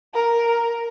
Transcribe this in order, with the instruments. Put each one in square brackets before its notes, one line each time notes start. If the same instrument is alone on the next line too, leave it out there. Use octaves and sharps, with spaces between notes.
[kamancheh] A#4